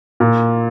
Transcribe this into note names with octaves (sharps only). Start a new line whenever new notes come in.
A#2